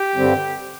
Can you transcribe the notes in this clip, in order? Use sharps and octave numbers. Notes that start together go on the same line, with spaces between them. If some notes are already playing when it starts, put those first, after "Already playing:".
Already playing: G4
G2 D3 G3 C4